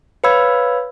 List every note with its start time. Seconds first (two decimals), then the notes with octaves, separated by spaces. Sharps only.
0.24 B4 C#5 F5 B5 E6 G#6